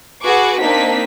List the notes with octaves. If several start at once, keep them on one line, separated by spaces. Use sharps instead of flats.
F#4 G#4 B4 C#6 D6
A#3 C4 D4 D#4 B6